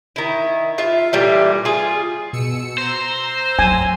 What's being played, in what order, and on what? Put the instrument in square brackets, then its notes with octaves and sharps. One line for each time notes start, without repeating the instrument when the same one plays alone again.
[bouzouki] D#3 E4
F4 E5
A#2 E3 G3 A3
F4 G#4
[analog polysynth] B2 E6 C#7
[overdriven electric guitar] C5 [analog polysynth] A#5 E6
[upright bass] F#3 [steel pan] G#5